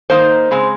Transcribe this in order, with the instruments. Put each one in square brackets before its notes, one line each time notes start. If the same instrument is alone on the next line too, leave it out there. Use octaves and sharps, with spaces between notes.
[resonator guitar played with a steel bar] D#3 A#3 D#4 C5
C#3 G#3 C4